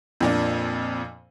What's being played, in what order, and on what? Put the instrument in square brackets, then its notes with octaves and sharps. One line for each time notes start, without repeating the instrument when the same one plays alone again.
[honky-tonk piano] F2 A#2 D4